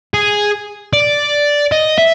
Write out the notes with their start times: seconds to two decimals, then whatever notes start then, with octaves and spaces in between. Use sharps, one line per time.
0.14 G#4
0.93 D5
1.72 D#5
1.98 E5